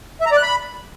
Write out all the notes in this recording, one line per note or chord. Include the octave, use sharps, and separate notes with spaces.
E5
A#5
D5
F#6
B5